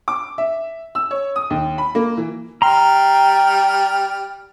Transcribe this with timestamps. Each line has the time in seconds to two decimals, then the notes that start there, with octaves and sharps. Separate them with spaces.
0.08 D6
0.38 E5
0.95 E6
1.11 C#5
1.36 D#6
1.50 D#2
1.78 B5
1.95 A#3
2.17 E3
2.62 G3 G5 A#5 C6 F6